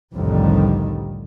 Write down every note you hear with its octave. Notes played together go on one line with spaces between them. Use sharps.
C2 F2 A2 D3 D#3 G3